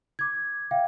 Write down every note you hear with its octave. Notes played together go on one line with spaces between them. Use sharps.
D6 G#6
E5 F5 G5